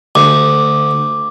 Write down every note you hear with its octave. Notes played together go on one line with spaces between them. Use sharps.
D2 D6